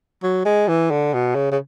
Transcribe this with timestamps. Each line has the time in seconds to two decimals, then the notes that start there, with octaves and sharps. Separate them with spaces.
0.23 F#3
0.45 G#3
0.68 E3
0.91 D3
1.14 B2
1.35 C#3
1.52 C#3